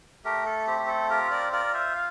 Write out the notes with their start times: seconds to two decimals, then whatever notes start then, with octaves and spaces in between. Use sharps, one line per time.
0.24 A3 G4 A#4
0.46 A4
0.67 C4 G4
0.79 G4
0.88 A4
1.10 F4 G4 A#4
1.31 A#4 D5
1.52 F4 A#4 D5
1.74 C5 E5
1.95 F5